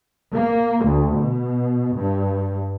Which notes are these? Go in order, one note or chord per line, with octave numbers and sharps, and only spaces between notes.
A#3
D2
B2
G2